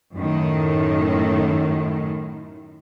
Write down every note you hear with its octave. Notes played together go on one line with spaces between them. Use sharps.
F#2 A2 D#3